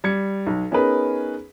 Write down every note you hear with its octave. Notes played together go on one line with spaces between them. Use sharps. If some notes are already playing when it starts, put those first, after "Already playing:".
G3 G#6 C#7
B1
B3 C#4 D#4 G#4 A#4 B4